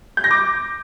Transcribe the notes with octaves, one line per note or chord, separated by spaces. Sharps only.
G6
A#6
D6